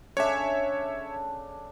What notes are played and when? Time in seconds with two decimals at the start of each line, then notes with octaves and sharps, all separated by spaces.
0.17 C#3 D4 A4 C#5 E5